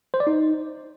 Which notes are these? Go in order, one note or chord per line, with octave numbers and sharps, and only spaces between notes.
C5
D5
D#4